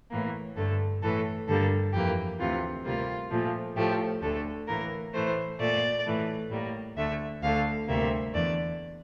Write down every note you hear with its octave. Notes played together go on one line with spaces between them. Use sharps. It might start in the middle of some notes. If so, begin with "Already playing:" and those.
A2 E3 A#3
G2 D3 A3 A4
A2 E3 A3 A4
G2 D3 G3 A#3 A4
F2 E3 A#3 G4
D2 C3 E3 F4
D2 C3 G3 A#3 F4
A#2 F3 A3
A2 F3 A3 G4
D2 D3 A3 A4
A2 E3 A#3 A#4
A2 E3 A3 C5
A#2 A3 D5
A2 E3 A3
A2 G3 A#3
D2 D3 A3 E5
D2 D3 A3 F5
D2 C3 G3 A#3 E5
E2 D3 A3 D5